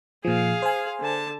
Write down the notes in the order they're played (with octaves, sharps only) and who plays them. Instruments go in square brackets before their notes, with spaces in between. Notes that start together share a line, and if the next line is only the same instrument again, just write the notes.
[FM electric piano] A#2 F3 [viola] G#4 F5
[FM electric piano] C5 G#5
[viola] D3 A5